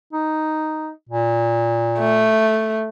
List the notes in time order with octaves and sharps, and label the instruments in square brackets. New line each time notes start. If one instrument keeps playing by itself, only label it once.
[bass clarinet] D#4
A#2
[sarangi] A3